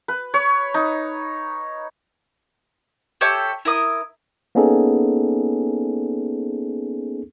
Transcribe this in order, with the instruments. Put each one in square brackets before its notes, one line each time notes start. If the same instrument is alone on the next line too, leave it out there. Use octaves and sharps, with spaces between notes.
[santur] B4
C#5
D#4
[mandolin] G4 A4 C#5 E5
E4 A#4 D#6
[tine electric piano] A#3 B3 C#4 D#4 G#4 A4